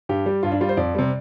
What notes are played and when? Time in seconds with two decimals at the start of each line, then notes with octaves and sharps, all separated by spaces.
0.09 G2 G4
0.26 G3
0.43 G2 F4
0.52 D4
0.61 G3 F4
0.69 C5
0.77 F2 D5
0.95 C3 G3